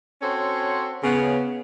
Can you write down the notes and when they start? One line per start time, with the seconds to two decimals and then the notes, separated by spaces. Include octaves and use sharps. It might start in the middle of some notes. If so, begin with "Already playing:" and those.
0.22 C4 C#4 F#4 A4 C5 C#5
1.03 C#3 B3